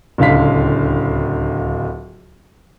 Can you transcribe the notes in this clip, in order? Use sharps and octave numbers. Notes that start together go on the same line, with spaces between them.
D1 C#2 D3 F5 B6